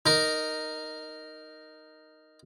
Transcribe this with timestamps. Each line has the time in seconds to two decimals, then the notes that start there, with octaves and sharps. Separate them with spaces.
0.06 D#4 A#4